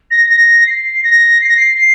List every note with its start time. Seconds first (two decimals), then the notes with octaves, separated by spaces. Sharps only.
0.11 A#6
0.30 A#6
0.66 C7
1.04 A#6
1.41 C7
1.48 A#6
1.56 C7
1.77 C7